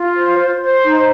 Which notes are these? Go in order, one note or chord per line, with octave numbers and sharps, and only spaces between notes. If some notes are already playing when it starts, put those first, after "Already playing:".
Already playing: F4
C5
C5
C5
D#4